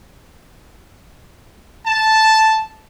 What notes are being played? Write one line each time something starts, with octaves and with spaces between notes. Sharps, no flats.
A5